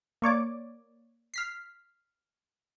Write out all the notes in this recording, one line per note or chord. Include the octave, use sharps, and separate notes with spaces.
A#3 C#5 D5 D6
F6 B6 C7